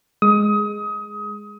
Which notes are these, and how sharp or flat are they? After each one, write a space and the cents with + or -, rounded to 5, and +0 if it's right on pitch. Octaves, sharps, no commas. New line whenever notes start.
G#3 +0 D#6 +25